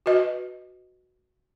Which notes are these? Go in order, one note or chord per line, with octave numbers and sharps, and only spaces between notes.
F#4 B4 D#5